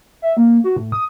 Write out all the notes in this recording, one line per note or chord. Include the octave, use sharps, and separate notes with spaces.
E5
A#3
F#4
A2
D#6